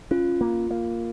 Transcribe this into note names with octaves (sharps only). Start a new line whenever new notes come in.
C#4 F4
A#3
A#3